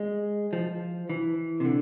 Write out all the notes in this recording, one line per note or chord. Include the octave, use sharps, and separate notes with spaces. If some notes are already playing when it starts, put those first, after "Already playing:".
Already playing: G#3
F3
E3
C3
D3